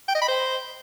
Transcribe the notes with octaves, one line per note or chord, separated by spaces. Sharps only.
G5
D#5
B5
C5